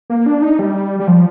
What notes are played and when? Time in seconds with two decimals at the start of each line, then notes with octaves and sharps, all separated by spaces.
0.10 A#3
0.26 D4
0.42 D#4
0.59 G3
1.00 G3
1.08 F3